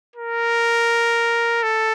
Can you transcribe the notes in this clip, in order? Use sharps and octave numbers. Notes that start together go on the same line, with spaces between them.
A#4
A4